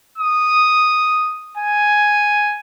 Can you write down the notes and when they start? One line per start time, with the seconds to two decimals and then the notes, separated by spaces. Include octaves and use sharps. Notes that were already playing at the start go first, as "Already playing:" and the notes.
0.18 D#6
1.57 G#5